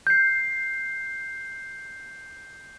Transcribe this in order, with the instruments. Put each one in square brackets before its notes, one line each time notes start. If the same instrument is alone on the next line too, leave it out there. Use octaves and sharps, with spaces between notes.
[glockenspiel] G6 C7